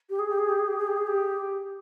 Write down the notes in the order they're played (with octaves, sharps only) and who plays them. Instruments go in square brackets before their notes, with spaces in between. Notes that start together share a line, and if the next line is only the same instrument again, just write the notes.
[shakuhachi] G4
G#4
G4
G#4
G4
G#4
G4
G#4
G4
G#4
G4